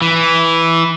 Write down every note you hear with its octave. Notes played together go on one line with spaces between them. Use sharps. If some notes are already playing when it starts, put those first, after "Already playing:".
E3